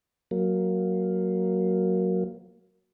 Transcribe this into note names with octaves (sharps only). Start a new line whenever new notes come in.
F#3 A#3